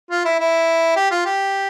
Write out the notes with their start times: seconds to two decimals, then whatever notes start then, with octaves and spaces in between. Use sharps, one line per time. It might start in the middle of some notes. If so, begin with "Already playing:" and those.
0.11 F4
0.25 E4
0.40 E4
0.96 G4
1.11 F4
1.25 G4